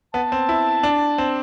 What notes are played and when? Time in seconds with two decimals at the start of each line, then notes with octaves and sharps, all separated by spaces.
0.14 B3 A5
0.32 C4
0.49 E4
0.83 D4
1.18 C4